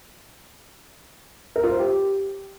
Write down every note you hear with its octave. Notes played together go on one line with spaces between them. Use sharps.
A#4
F4
C5
G4